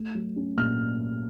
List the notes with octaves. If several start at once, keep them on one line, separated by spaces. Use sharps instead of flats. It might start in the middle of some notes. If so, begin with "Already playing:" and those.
Already playing: A3
F#3
C#4
A#2 F6